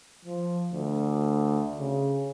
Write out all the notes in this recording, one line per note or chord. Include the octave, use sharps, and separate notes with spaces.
F3
D2
C#3